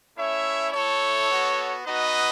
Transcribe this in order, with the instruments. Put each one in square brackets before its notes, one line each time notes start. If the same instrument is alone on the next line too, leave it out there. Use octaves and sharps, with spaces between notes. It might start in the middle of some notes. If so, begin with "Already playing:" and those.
[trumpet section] A3 C#4 E4 C#5 E5
A3 E4 A4 C#5
B3 F#4
B3 D#4 F#4 B4 D#5